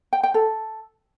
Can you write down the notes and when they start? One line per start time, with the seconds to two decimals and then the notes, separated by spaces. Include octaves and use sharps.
0.13 G5
0.23 G5
0.34 A4